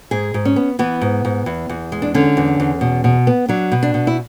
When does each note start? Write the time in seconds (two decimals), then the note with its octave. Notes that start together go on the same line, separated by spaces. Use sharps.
0.11 G#2 G#4
0.34 G#2
0.45 C#4
0.56 B3
0.79 E3 B3
1.01 G#2
1.25 G#2
1.46 E2
1.69 E2
1.92 G#3
2.02 D4
2.14 D3 C#4
2.37 E2
2.60 E2
2.81 B2
3.04 B2
3.27 B3
3.49 F#3 D4
3.72 B2
3.83 D4
3.94 B2
4.07 E4